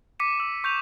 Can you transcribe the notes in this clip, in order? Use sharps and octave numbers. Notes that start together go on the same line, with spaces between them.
D6 B6 C#7 D#7 E7
E6
C#6 G6 C#7 F7